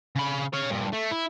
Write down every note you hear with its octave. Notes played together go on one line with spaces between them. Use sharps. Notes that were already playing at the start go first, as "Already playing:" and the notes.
C#3 B5
C#5 F5
G2 A#2
A3
E4